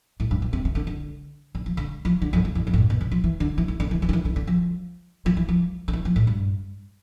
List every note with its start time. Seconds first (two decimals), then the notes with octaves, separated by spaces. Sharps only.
0.20 A2
0.31 G2
0.42 B2
0.53 C3
0.65 C3
0.75 D3
0.87 D3
1.55 D3
1.66 F3
1.77 D3
2.05 F3
2.22 D3
2.33 F2
2.45 E2
2.55 E2
2.67 F2
2.73 A2
2.78 G2
2.90 B2
3.01 D3
3.11 F3
3.24 E3
3.40 D3
3.58 E3
3.68 D3
3.80 D3
3.91 E3
4.02 E3
4.09 D3
4.13 E3
4.25 D3
4.36 D3
4.47 F3
5.26 F3
5.37 E3
5.49 F3
5.88 D3
5.93 E3
6.05 F3
6.16 A2
6.27 G2